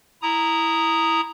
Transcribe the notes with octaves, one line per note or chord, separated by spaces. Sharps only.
E4 A#5 D#6